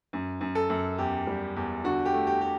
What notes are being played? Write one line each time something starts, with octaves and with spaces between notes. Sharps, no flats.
F#2
F#2
A4
F#2
E2 G4
G3
E2
D3 F#4
G4
A3
G4
G4